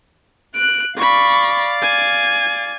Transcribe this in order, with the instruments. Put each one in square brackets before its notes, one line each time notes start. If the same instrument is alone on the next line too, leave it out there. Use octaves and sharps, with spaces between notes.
[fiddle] F#6 [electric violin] D7
[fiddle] D5 F5 [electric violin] B5 C#6
[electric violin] G#5